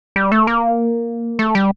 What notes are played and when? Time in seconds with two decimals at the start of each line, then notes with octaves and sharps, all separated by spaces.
0.16 G3
0.32 A3
0.47 A#3
1.39 A3
1.55 G3